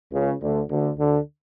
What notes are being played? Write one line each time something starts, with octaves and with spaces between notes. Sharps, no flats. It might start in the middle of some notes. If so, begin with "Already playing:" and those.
C#2 C#3
D2 D3
D2 D3
D2 D3